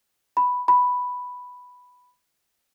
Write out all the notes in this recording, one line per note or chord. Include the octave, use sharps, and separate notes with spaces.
B5
B5